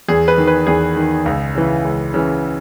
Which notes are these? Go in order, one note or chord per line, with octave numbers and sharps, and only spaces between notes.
E2 G#4
B4
D#3
B4
E2 G#4
D#3
C#2
C#3 E3
C#2
C#3 E3